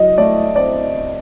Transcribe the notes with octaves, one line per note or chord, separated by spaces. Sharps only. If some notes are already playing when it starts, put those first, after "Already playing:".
Already playing: F#3 D#5
A3 D5
C4 D5